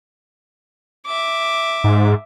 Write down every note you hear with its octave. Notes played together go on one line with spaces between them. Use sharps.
E5 D6
G#2